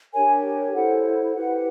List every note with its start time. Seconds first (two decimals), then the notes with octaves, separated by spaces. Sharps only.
0.13 D4 G4 A#4 C#5 G#5
0.74 E4 A4 C5 F#5
1.34 E4 G4 B4 F#5